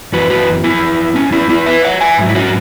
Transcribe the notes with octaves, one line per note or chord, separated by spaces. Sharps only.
F#2 E3 F#4 B4
F#4 B4
B3 E4
C#4
B3 E4
B3 E4
B4 E5
C#5 F#5
E5 G#5
G#2 F#3
E4
C#4 F#4